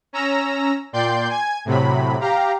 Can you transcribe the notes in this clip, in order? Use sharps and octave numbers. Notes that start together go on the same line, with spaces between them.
C#4 A#5 E6 A#6
A#2 D5 G5 C6 G6
G#5 G#6
A2 C3 F#3 B5
G4 F5 A#5